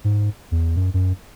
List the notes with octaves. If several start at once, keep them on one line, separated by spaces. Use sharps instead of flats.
G#2
E2
F#2
F#2